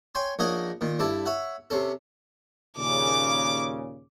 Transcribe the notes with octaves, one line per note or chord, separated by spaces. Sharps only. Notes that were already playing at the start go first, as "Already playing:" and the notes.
C#5 G5 G#5 C6
A#1 A#3 D#4 C#5 D#5 F#5
A#2 D#3
G2 E4 A4 D5
C#5 E5 F#5
C3 C#4 A4
D#2 A#2 C#3 D6